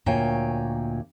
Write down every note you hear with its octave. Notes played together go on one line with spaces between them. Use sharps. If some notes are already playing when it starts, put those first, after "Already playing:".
D2 A#2 A#3 C#5 G5 G#5